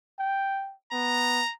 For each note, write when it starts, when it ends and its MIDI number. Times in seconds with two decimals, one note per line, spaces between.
0.19 0.74 79
0.93 1.41 59
0.93 1.52 82